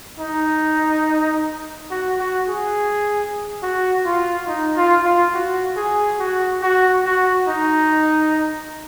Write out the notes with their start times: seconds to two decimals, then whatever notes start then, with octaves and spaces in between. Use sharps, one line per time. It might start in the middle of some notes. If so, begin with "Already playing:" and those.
0.19 D#4
1.90 F#4
2.19 F#4
2.48 G#4
3.63 F#4
4.05 F4
4.48 D#4
4.76 F4
5.05 F4
5.34 F#4
5.76 G#4
6.19 F#4
6.62 F#4
7.05 F#4
7.48 D#4